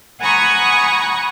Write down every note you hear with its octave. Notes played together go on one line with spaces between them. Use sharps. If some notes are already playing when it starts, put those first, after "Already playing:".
F#5 G#5 A#5 B5 C#6 D#6